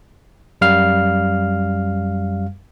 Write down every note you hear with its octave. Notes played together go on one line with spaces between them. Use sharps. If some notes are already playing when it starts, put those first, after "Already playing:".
F#2 G3 F5 F6